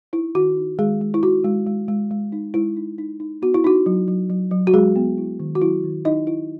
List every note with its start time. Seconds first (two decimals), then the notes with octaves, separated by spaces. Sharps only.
0.13 D#4 E4
0.35 D#3 F#4
0.57 D#4
0.79 D#3 G#3 G#4
1.01 G#3
1.14 E4
1.23 D#4 F#4
1.44 G#3
1.67 G#3
1.88 G#3
2.11 G#3
2.32 D#4
2.54 G#3 E4
2.77 D#4
2.98 D#4
3.20 D#4
3.42 B3 F#4
3.54 E4
3.64 D#4 F#4
3.86 F#3
4.08 F#3
4.30 F#3
4.51 F#3
4.67 F#4
4.73 F#3 G#3 G#4
4.96 B3
5.18 E4
5.40 D#3
5.55 F#4
5.61 F#3 E4
5.84 D#3
6.05 D#4 E4 D#5
6.27 E4